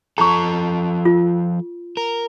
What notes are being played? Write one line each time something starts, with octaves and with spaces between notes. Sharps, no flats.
F3 A4 A#5 C#6
F4
A#4